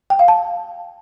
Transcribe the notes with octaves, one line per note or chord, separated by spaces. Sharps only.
G5
F5
A5